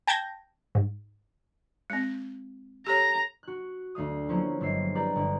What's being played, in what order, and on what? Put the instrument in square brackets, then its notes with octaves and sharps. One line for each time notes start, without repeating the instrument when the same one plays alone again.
[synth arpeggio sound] G5 A5 G6 G#6 A#6
G#2
[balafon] G#3 C4
[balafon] G4 A4 C#5 [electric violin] A#5
[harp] F#4 F#6
D2 A3 F5 D#6
F3 F#3 A#3 B3 C#4 E4
G1 G#3 E5 E6 C7
E4 G4 G#4 B4 D5 A#5
G1